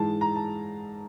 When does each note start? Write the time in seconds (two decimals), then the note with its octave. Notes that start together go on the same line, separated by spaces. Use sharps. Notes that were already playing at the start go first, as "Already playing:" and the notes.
Already playing: G#2 E3 G#3 A5
0.21 A#5
0.36 A5